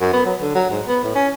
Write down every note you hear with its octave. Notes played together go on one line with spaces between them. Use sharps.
F#2
B3
F#3
D3
F#3
G#2
B3
A2
C#4